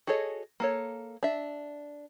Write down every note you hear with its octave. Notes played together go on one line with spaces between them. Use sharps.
F#4 G#4 A4 C#5 D#5
A#3 A4 C#5
D4 E5